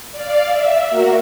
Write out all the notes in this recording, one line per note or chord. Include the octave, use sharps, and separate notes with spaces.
D5 F5
E5
A#3 F#4 A#4